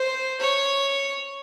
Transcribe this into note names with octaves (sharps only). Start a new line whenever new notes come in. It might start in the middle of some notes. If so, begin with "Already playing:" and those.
Already playing: C5
C#5